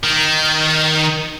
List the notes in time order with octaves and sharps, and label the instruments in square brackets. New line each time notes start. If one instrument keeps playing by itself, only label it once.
[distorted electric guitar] D#3